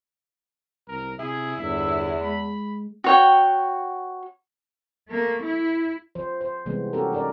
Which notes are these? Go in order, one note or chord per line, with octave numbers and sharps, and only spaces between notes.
C2 A#4
C3 E4 G#4
G1 E2 E5
G#3 B5
F#4 C#5 G5
A3 A#3
E4
F3 C5
C5
C3 E3 G3 G#3 B3
C#4 F#4 G4 A4 A#4
C#4 D#4 A#4 D5